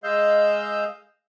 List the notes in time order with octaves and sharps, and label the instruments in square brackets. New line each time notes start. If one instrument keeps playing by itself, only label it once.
[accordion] G#3 D#5 F5 E6 G6